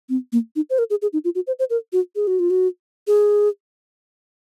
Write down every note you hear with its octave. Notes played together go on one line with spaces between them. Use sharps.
C4
A#3
D#4
C5
A#4
G#4
G#4
D#4
F4
F#4
C5
C5
A#4
F#4
G#4
F#4
F4
F#4
G#4